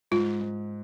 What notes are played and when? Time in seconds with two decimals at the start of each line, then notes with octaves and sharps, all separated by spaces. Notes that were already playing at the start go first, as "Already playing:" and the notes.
0.11 G#2 F4
0.40 G#2